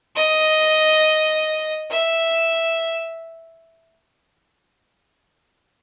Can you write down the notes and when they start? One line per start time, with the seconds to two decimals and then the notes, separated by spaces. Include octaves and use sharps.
0.15 D#5
1.89 E5